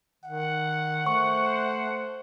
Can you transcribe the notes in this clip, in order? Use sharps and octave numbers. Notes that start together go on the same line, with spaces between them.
D#3 F#5
A3 C5 C#6